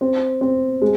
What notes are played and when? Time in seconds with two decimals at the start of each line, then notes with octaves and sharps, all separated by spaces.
0.01 C4
0.41 C4
0.82 G#3